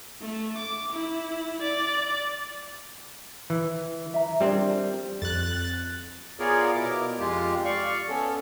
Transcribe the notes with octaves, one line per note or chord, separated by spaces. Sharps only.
A3
D6
E4
D5
E3
E5 A#5
G3 C4 D4 G#4 A#4
F2 F#6 A6
B3 F4 G#4 A#4 C#5 D5
B2 E4 A#4 D6
F2 G#3 F4 G4
D5 F5 C#6
B3 C#4 A4